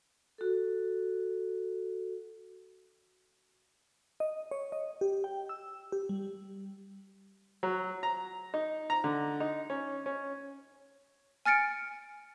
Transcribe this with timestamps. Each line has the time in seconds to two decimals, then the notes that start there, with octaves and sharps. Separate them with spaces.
0.38 F#4 A4
4.20 D#5
4.51 C#5
4.72 D#5
5.01 G4
5.24 G5
5.49 E6
5.92 G4
6.09 G3
7.63 F#3
8.03 A#5
8.54 D#4
8.90 A#5
9.04 D3
9.40 D#4
9.70 C#4
10.06 C#4
11.46 G#5 F6 A6 C#7 D7